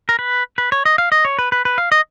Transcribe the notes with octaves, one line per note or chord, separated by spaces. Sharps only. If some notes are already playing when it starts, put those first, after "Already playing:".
A#4
B4
B4
C#5
D#5
F5
D#5
C#5
B4
B4
B4
F5
D#5